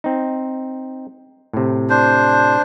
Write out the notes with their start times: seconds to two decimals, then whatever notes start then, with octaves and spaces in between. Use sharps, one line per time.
0.04 C4 D#4
1.53 A2 C3
1.90 D4 C5